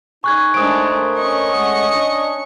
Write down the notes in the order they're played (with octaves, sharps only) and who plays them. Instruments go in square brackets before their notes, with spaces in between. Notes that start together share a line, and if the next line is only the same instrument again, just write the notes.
[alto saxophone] D#4 [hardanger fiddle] G#4 [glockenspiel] C#6 F#6 G#6
[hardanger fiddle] G#3 D4 [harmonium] A3 A#4 C5 [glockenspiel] D#6 D7
[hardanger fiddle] C#4 C#6 [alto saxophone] D#5
[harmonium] G#3 A3 F#5 [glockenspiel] D#6
[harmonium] D4